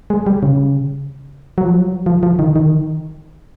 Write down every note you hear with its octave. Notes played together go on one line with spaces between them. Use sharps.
G#3
G3
C#3
F#3
F3
F#3
F3
F3
D#3
D#3